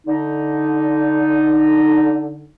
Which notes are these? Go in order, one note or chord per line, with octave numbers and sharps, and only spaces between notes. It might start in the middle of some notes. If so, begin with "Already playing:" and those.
D3 D#4